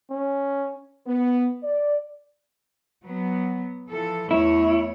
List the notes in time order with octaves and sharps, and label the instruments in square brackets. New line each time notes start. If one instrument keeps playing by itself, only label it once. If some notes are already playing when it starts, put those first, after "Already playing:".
[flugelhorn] C#4
[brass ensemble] B3
D5
[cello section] F#3 B3
E3 F3 A4
[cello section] E2 A3 C#5 [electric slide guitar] E4